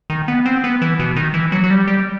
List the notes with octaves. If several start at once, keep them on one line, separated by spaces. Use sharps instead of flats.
D#3
B3
C4
B3
E3
B2
D#3
E3
F#3
F#3
G3
G3